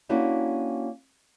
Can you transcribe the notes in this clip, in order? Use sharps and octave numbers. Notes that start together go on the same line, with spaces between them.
A#3 C#4 D4 E4 F#4 G4